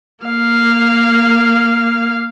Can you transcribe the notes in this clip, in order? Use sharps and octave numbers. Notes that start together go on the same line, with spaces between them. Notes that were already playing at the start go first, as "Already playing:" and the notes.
A#3 F5